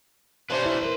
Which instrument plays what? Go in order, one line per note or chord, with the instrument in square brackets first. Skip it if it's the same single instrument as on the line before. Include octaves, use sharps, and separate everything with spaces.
[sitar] B2 C#4 D4 [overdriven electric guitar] B4 C6
[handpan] E4 E5
A#4 C5